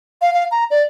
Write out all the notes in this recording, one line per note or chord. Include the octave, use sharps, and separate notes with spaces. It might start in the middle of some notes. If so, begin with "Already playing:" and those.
F5
F5
A#5
D5